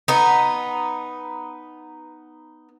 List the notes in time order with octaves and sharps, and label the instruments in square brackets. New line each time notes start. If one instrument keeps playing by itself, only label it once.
[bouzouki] B3 D#4